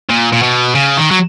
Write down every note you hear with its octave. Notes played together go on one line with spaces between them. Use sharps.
A#2
A#2
B2
C#3
D#3
F#3